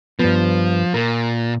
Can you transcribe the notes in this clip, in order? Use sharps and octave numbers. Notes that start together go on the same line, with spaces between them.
G2 F3 B3
A#2 A#4